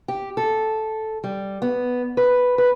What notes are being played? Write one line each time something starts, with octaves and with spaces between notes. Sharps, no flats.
G4
A4
G3
B3
B4
B4